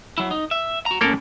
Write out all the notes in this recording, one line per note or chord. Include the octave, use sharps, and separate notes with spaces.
F#3 E4
D#4
E5
F#4 A#5
A2 A#3 C#4 A4 A#4